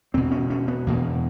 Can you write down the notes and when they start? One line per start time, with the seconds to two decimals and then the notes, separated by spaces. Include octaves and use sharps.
0.14 E2 C4
0.17 B2
0.32 C#4
0.50 C#4
0.68 B3
0.87 E2 B2 A#3